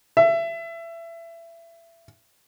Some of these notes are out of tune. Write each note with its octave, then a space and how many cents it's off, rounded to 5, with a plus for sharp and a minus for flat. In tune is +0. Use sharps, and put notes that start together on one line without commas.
E5 +25